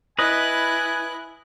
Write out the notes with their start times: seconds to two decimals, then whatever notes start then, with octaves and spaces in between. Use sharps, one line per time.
0.19 E4 B4 D#5 G#5 F#6